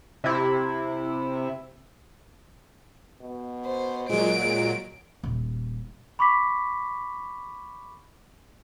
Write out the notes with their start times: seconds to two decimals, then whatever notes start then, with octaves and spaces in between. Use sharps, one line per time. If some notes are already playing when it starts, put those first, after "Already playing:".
0.24 C3 E4
3.22 B2
3.66 C5
4.09 A#2 F#3 G#3 D7
4.40 G#3
5.23 D#1
6.19 B5 C#6 D6 B6